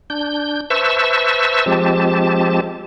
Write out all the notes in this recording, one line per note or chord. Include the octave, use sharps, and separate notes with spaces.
D4 G6
B4 C5 E5 A5 C#6 E6
F3 G#3 C4 G4 A5